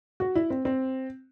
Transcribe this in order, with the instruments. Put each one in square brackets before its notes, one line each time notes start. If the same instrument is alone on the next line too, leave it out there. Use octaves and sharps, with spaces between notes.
[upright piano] F#4
E4
C4
C4